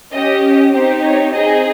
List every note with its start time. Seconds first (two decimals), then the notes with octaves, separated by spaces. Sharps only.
0.13 C#4 G4 D#5
0.72 C4 D#4 G4 C5
1.02 C#5
1.32 C4 D#4 G#4 D#5